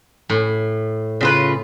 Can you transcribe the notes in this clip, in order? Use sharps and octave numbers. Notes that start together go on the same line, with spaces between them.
A2
C#3 F4 B4